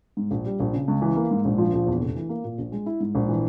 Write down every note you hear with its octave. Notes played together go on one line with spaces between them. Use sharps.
G#2
A#1
G3
A#1
C#3
C#2
E3
A#3
G#2
A#1
F3
A#1
E2
F1
E3
A#3
A#2
A#1
G#3
E4
G#2
A#1
E3